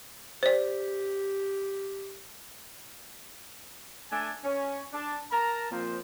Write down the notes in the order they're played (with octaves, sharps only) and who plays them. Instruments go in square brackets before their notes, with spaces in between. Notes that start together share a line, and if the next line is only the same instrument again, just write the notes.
[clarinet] G4 [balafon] C5 D5
[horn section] A3 D4 G#5
C#4
D4 A5
A#4 A5 A#5
A#2 F3 A#3 C4 C5